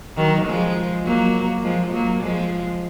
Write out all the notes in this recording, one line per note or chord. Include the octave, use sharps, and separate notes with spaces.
D#3 F#3
F3 G#3
F#3 A#3
F3 G#3
F#3 A#3
F3 G#3